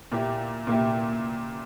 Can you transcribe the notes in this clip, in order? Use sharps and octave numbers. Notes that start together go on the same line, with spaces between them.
A#2 A#3 E4 G4
A#2 A#3 E4 G4